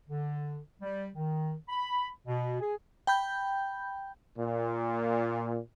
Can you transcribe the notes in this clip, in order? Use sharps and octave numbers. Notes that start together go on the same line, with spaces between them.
D3
G3
D#3
B5
B2
G#4
G5 B5 G6
A#2